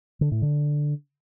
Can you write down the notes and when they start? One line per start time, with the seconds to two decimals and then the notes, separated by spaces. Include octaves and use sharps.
0.21 D3
0.31 A2
0.42 D3